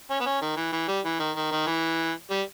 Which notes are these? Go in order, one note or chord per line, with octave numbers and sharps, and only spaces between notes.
C#4
B3
C#4
D#3
E3
E3
G3
E3
D#3
D#3
D#3
E3
G3